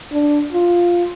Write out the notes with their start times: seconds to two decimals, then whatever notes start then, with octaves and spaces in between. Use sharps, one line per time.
0.12 D4
0.53 F4